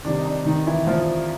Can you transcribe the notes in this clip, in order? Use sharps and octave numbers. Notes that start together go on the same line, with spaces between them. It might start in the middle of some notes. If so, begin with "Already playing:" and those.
C3 D#3 G3 D4
D#4
D4
D#3 D#4
E3 E4
F3 F4